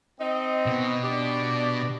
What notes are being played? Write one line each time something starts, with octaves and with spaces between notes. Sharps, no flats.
C4 D#4 D#5
B2
D4 G4 D5